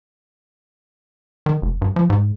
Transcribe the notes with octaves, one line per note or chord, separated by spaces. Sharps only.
D#3
F1
G2
F3
G#2